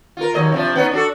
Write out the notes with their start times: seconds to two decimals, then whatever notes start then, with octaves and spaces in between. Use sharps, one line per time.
0.17 F4 A#4
0.34 D#2 F#3 D#5
0.52 C3 F3 D4
0.76 B3 C#4 D#4
0.91 D4 F#4 A4